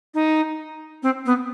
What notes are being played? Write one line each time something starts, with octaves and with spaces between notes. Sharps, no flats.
D#4
C4
B3